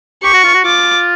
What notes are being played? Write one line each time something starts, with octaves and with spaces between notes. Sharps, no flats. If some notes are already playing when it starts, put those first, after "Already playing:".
G4 C#6
F#4
F4
F#4
F4 D6